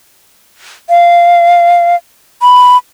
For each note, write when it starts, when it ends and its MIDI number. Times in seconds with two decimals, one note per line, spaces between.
0.90 1.96 77
2.42 2.77 83